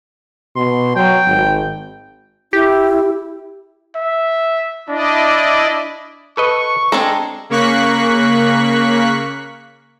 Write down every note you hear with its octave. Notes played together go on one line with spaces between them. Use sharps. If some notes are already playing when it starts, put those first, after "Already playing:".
B2 C6
F#3 G5
G#1
E4 G4
E5
D4 E4 D5 D#5
A4 B4 D#5 C#6
G#3 C4 D4 A4 A#5
C#3 A#3 C#6 F#6 B6